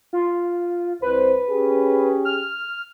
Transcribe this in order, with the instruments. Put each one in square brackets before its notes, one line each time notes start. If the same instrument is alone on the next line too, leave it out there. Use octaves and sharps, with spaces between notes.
[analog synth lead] F4
[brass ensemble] C2 C5 [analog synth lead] B4
[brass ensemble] C#4 G4 G#4
[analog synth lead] F6